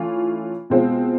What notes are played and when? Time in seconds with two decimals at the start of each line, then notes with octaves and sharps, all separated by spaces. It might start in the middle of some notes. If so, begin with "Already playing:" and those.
Already playing: E3 A3 C#4 F4
0.70 B2 G#3 C4 F4